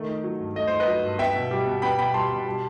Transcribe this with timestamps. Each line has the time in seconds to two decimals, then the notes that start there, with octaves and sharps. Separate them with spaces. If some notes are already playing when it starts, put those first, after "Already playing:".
Already playing: D#3 A3
0.08 D#4
0.24 F#3
0.40 G2
0.56 A3 D#5
0.67 D#4 C5
0.80 B4 D#5
0.87 F#3
1.03 G2
1.19 B3 E5 G5
1.35 B2
1.51 G3
1.66 B2
1.82 B3 G5 B5
1.98 B2 G5 B5
2.14 G3 A5 C6
2.31 B2
2.46 G3